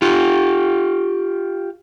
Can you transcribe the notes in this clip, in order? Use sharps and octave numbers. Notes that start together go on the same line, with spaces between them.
F4 G4